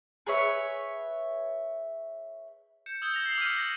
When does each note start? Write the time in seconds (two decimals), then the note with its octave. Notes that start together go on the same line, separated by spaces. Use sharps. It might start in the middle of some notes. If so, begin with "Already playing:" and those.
0.27 G#4 B4 C#5 E5
2.86 G6 C#7 E7
3.02 D#6 E6 G6 G#6 G7
3.14 E6 A#6 F7
3.26 C7 F#7
3.38 D6 F6 G6 B6 C#7 D#7
3.58 G#6 A#6 F#7